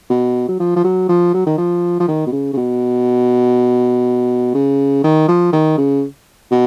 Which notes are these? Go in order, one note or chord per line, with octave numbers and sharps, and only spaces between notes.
B2
F#3
F3
F3
F#3
F3
F#3
D#3
F3
F3
D#3
B2
C#3
C#3
B2
C#3
D#3
F3
D#3
C#3
B2